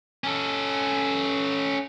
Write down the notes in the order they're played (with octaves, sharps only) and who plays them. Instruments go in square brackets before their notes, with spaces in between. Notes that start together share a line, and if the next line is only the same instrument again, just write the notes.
[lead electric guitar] C#4 A4